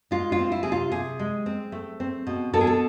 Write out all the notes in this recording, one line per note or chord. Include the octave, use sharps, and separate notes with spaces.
G#3 F4
F4
C4
E4
C3 G#4
F4
C3 G#4
G#3
C4
A3
C4
B2
B2 A4
G#4
A4